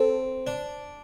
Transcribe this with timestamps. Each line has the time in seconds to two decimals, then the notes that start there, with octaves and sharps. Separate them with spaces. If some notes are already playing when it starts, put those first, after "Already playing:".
Already playing: C4 A4
0.47 D4